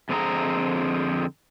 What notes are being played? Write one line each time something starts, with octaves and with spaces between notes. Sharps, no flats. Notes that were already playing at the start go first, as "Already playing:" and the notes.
F2 D3 C4 F4 G#4 A#5